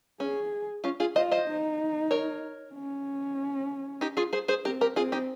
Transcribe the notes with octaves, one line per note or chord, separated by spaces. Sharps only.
C#4 G#4
C#4 F4
F4 G#4
F4 C5 D#5
C5 D#5
D#4
A#4 C#5
C#4
D#4 G4
F4 G#4
G#4 C5
G#4 C5
C4 G4 A#4
G4 A#4
C4 F4 G#4
D#4 G4